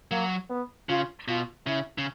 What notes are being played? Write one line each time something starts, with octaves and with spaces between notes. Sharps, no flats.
F#3 A#3
B3
C#3 F4
B2 F4
C#3 E4
C#3